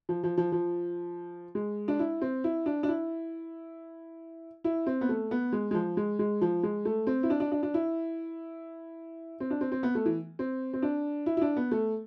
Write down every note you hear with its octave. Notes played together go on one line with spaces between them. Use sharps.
F3
F3
F3
F3
G#3
D4
E4
C4
E4
D4
D4
E4
E4
C4
B3
A3
B3
G#3
G#3
F3
G#3
G#3
F3
G#3
A3
C4
E4
D4
D4
D4
D4
E4
C4
D4
C4
C4
B3
A3
E3
C4
C4
D4
E4
E4
D4
B3
A3